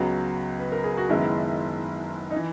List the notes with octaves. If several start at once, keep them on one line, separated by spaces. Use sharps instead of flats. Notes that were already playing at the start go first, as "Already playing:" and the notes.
Already playing: C#2 C#3 F#3 B3 F#4
B4
A#4
G#4
F#4
F#1 F#2 D#3 G#3 B3 E4
D#4
E3